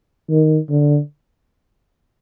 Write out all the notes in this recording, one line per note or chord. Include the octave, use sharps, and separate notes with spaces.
D#3
D3